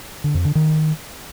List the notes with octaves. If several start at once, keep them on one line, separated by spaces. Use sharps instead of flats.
D3
F2
D3
D#3